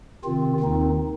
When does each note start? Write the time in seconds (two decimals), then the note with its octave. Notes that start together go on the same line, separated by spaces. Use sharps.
0.24 C3 D#3 C4 F4
0.60 D#2 D#3 C4 D#4